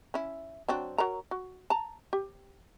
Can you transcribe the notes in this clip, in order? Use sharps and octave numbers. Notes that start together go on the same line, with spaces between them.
C#4 E4
F#3 C4 D4
F#3 A#4 A#5
F#4
A5 A#5
G4